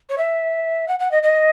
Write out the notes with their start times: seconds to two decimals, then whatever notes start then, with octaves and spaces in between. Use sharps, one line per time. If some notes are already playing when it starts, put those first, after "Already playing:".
0.09 C#5
0.18 E5
0.88 F#5
0.99 F#5
1.11 D#5
1.23 D#5